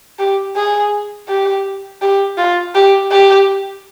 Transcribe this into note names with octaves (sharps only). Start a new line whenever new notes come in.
G4
G#4
G4
G4
F4
G4
G4